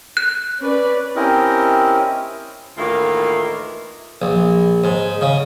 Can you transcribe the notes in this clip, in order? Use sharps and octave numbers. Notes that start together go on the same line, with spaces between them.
F#6
C#4 B4 D5
C4 C#4 E4 G4 A#4 D#5
D2 A2 D#3 E3 A#3 F4
A#1
G#2
C#3